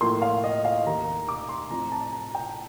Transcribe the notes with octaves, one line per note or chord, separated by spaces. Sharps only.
A2 F3 A#3 C6
F5
D#5
F5
D#2 D#3 A#3 A#5
D6
C6
A2 F3 C4 A#5
A5
A#5
G5